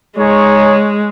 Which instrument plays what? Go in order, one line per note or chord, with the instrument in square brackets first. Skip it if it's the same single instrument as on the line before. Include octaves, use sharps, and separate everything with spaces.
[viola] G#3 [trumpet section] D#4 G#4 C#5